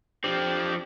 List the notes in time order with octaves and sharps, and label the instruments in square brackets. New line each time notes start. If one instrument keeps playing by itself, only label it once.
[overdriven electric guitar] F3 C4 [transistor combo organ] D4 G4